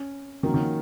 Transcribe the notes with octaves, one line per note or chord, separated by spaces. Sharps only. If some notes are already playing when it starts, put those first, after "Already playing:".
Already playing: C#4
D#3 F3 A#3 C#4 F#4 A#4
D#3